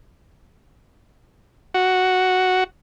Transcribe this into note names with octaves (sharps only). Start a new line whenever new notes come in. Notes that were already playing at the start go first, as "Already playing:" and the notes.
F#4